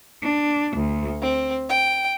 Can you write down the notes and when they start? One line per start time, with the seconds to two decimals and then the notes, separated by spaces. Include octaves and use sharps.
0.23 D4
0.77 D2
1.22 C4
1.70 G5